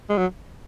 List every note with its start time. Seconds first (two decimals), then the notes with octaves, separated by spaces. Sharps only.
0.10 G#3
0.18 F#3